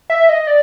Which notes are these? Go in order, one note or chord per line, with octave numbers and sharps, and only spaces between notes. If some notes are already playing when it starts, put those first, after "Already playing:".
E5
D#5
D5